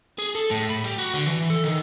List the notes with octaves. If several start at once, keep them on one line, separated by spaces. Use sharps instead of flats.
G#4
A4
A2
B5
G4
F#4
D3
E3
A4
D#3